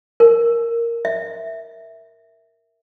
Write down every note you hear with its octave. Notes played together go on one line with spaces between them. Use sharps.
A#4
E5